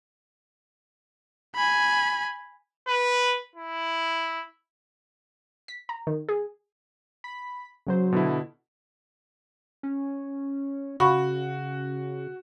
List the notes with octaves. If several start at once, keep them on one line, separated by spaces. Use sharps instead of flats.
G#5 B5
B4
E4
B6
A#5
D#3
G#4
B5 B6
C#3 F#3 C5
B2 D3 E4
C#4
C#3 F#4 F5 B5 C#6